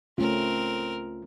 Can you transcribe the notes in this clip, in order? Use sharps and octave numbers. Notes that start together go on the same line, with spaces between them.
C#2 A3 C4 C#4 F4 A#4